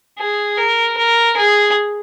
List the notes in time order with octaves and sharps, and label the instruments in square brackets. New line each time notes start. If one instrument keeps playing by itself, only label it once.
[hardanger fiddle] G#4
A#4
A#4
G#4